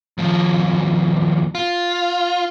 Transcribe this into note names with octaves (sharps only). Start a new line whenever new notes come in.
D#2 F3
F4